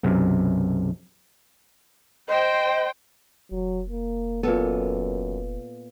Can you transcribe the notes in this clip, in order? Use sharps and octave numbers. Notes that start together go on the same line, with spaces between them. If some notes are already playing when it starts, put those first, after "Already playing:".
B1 F#2 C3
C5 D#5 G5
F1 F#3
A#3
F#2 A#2 B3 A4